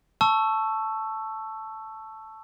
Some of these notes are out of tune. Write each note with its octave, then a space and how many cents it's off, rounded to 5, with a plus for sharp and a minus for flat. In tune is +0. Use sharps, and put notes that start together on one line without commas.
A5 +0 C#6 +0 E6 +10